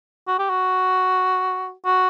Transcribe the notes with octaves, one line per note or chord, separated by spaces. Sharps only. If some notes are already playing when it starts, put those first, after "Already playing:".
F#4
G4
F#4
F#4